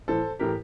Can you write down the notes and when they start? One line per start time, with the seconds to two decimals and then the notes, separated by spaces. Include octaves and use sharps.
0.08 A2 E3 A4 C5
0.39 A2 E3 G4 A#4